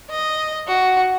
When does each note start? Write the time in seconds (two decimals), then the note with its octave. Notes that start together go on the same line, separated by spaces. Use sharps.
0.11 D#5
0.68 F#4